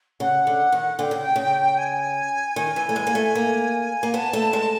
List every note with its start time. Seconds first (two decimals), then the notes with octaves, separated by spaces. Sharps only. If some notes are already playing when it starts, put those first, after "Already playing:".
0.20 C#3 F#5
0.47 D3
0.72 D#3
0.99 D3 G5 G#5
1.11 C#3
1.36 C#3
1.77 G#5
2.56 D#3
2.76 E3
2.89 A3
2.96 G#3
3.07 A#3
3.15 A3
3.35 A#3
4.03 A#3
4.14 B3 A5
4.33 A3
4.53 G#3